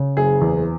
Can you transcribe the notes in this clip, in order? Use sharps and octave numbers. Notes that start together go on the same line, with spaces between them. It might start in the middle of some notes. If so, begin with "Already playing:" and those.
Already playing: C#3
F#1 G#4
E2